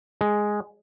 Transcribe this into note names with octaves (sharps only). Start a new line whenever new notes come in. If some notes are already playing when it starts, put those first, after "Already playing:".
G#3